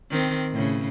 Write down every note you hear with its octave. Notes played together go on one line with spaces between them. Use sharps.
D#3 C4
A2 C#3